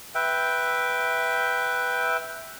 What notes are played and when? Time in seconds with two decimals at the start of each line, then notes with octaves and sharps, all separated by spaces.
0.15 B4 E5 G5